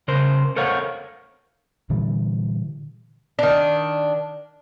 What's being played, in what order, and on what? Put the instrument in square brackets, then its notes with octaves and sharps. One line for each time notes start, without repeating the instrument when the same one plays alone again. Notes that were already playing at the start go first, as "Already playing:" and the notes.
[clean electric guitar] C#3 A#4 C5
A4 A#4 C5 C#5 F5 F#5
[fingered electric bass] A#2 D3 E3 G3
[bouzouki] D#3 D4